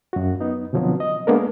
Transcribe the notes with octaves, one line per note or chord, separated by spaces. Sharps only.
F#2 F#4
B3 D#4
B2 D3 F3 F#3 B3 C4
D#5
G#3 A#3 B3 D4 A4 A#4